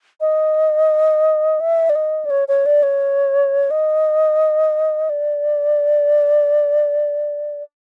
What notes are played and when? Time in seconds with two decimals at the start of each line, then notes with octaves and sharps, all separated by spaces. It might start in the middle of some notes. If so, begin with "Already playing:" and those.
0.21 D#5
1.60 E5
1.89 D5
1.95 D#5
2.25 D5
2.30 C#5
2.48 C#5
2.66 D5
2.83 C#5
3.70 D#5
5.09 D5